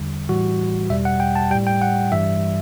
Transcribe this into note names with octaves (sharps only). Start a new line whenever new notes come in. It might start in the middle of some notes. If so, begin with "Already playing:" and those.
Already playing: E2 D3 G3
A2 E3 G3 F#4
E2 B2 G3 E5
F#5
G5
A5
A2 G3 G5
G5
F#5
G2 E3 G3 E5